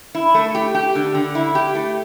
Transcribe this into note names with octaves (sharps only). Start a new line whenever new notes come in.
E4
A3
G4
G4
D3
D3
E4
G4
A3